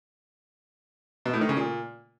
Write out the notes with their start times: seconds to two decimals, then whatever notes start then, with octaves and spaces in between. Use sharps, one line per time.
1.26 B2
1.33 A2
1.41 D#3
1.49 C#3
1.57 A#2